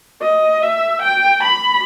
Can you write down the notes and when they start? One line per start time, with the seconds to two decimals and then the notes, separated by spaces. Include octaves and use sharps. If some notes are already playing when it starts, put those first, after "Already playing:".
0.22 D#5
0.62 E5
1.02 G5
1.43 B5